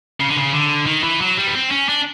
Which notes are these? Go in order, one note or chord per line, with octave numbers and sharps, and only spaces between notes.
C#3
D3
C#3
D3
D#3
E3
F#3
G3
B3
C4
C#4
D4